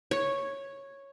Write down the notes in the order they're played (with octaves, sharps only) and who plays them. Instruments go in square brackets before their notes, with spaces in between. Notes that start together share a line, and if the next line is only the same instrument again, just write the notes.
[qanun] C#5